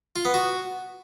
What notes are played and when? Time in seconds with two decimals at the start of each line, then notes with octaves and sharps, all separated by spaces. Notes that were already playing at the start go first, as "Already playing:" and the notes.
0.16 F4
0.25 B3
0.34 F#4